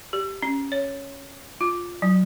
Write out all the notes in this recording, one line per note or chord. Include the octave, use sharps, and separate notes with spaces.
G4
C#4
C#5
F4
F#3